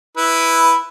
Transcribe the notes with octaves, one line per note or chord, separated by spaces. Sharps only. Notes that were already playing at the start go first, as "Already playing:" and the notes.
E4 B4